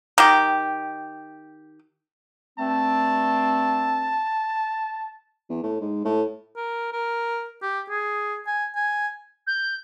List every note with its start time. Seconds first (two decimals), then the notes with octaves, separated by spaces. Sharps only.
0.18 D#3 G4
2.59 G2 A3 C4 A5
5.50 E2
5.63 A2
5.81 G#2
6.05 A2
6.56 A#4
6.93 A#4
7.62 G4
7.90 G#4
8.47 G#5
8.75 G#5
9.47 G6